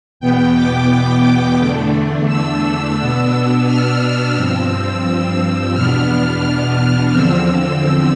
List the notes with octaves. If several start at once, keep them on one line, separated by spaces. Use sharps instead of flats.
E2 B2 B3 G5
D6
E2 D3 A3 D4
E6
B2 B3 D4
F6
G2 F3 C4 E6
E2 B2 B3 D4 F6
E2 D3 F3 C4 E6